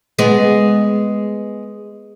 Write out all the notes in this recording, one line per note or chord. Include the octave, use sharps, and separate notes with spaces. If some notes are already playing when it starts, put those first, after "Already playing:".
G#3 B3